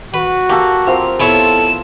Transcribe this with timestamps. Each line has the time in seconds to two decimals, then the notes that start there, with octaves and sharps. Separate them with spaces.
0.14 F#4 B4
0.50 A#3 G4 A4
0.87 C4 F4 A#4 F7
1.20 B3 E4 A4 C#5 E7